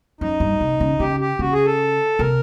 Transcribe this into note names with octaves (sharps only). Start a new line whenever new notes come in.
F#2 D#4
G2
C3
C#3
C#3 G4
G4
C#3 F#4
G#4
A4
C3 A#4